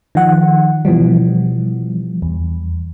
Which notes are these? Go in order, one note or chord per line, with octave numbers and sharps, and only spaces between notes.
D#3 F3 F#5
B2 E3 F3 G3
E2